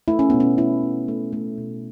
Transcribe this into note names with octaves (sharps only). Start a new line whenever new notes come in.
A3 E4
C#4
B2 B3
C#4
A3 E4
B2
A3
A3
B2